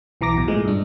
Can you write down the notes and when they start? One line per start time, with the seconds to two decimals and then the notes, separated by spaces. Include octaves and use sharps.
0.21 B1 E3 A#5 D6 A#6
0.36 A1 B2
0.48 A2 F3 G#3
0.65 G2 D4